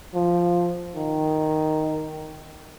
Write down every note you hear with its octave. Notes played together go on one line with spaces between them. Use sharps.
F3
D#3